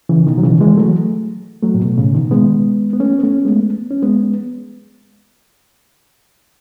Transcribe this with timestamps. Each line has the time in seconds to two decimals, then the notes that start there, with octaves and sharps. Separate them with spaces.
0.09 C#3 E3
0.27 B2 D#3
0.38 F#3
0.43 C#3 E3
0.61 E3 G#3
0.77 F#3 A3
1.63 F#3 A3
1.75 A2
1.80 B2
1.97 A2 C#3
2.14 B2 D#3
2.31 G#3 B3
2.93 B3
3.00 A3 C#4
3.19 B3
3.23 A3 C#4
3.45 G#3 B3
3.91 C#4
4.03 G#3 B3